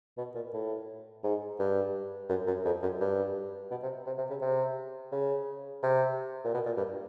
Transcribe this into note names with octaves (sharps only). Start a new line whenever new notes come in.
B2
A#2
A2
G#2
G2
F#2
F#2
F2
F#2
G2
B2
C3
C3
C3
C#3
C3
C#3
C3
A#2
B2
A#2
G2